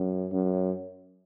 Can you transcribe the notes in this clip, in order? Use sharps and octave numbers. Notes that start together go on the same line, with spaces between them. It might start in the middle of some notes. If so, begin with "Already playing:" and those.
Already playing: F#2
F#2